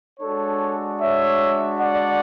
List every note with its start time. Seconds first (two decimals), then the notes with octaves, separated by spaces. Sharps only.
0.20 G#3 D4 F#4 A4 C#5
1.00 C#5 E5
1.80 D5 F#5